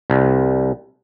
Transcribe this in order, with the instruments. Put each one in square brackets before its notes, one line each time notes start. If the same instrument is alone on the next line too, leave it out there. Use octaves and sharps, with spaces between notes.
[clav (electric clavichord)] C2